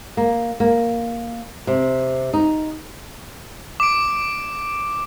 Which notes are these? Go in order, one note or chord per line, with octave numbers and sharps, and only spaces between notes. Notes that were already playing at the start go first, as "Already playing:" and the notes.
A#3
A#3
C3
D#4
D6 D7